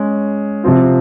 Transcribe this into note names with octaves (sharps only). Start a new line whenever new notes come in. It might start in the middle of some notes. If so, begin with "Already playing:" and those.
Already playing: G#3 C#4 G#4
C3 F3 C4 F4